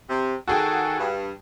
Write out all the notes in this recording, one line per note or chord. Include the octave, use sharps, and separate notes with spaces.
C3
D#3 F#4 G#4 A4 G5
G2